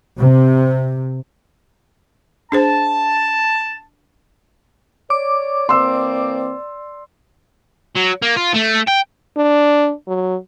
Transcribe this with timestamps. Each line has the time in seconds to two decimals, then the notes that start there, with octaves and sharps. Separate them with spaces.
0.18 C3
2.52 D4 G#4 C5 A5
5.10 C#5 D5 D6
5.69 E3 A#3 C4 C6 E6
7.95 F#3
8.22 A#3
8.37 F4
8.56 A3
8.88 G5
9.37 D4
10.08 F#3